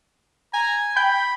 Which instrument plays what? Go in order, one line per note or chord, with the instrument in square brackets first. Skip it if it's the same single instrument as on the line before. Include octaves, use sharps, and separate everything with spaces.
[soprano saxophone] G#5 [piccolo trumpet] A#5
[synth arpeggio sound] G5 G6 [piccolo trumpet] B5